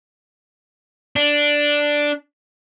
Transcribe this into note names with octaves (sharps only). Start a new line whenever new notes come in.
D4